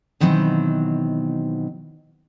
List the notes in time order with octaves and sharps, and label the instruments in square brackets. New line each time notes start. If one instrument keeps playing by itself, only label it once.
[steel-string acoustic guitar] B2 D#3 E3 F#3 C4